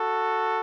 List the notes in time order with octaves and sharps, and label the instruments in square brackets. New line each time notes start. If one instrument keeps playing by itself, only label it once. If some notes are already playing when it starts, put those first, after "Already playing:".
Already playing: [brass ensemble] F#4 A4